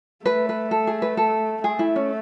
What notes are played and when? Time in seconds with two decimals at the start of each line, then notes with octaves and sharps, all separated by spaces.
0.25 A3 B4
0.49 B4
0.71 A4
0.87 G#4
1.02 B4
1.17 A4
1.64 A3 G#4
1.79 E4
1.96 C#4